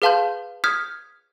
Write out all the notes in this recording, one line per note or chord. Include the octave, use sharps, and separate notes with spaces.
G#4 B4 F5 A5 C6 G6
D#6 F6 G6 G#6 B6